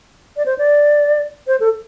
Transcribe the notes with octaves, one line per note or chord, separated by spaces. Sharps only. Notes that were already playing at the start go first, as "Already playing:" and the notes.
D5
C5
D5
C5
A4